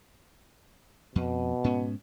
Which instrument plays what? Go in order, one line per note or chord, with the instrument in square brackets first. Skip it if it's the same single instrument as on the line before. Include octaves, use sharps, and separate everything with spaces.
[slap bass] F2 [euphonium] B2
[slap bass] G#2 B3 C#4